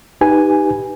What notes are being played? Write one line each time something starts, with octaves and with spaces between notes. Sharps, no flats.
D#4 G4 B4 G#5